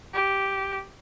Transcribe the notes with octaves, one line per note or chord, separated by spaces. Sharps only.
G4